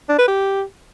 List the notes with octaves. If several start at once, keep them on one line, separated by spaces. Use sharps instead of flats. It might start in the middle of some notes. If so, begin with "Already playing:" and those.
D4
B4
G4